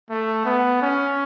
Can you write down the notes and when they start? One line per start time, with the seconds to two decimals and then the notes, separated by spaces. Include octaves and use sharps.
0.10 A3
0.45 B3
0.82 C#4